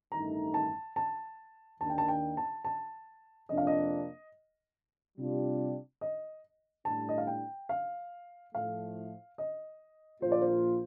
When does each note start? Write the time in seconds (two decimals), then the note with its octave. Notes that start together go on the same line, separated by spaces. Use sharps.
0.12 A1 G2 D#3 A3 D#4 A#5
0.54 A5
0.96 A5
1.80 D#2 D#3 A#3 D4 A5
1.90 G5
1.98 A5
2.08 G5
2.37 A5
2.65 A5
3.49 F2 C3 F3 A#3 D4 D#5
3.58 F5
3.67 D#5
5.17 C3 G3 D4 F4
6.01 D#5
6.85 A2 G3 D4 A5
7.09 D#5
7.18 F5
7.27 G5
7.69 F5
8.54 A2 F3 A3 F5
9.38 D#5
10.22 A#1 A#2 F3 A#3 F4 C5
10.32 D5
10.41 C5